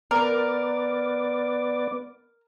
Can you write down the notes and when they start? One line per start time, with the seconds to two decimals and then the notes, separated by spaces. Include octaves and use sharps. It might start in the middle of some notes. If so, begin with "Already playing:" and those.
0.11 B3 A#4 D5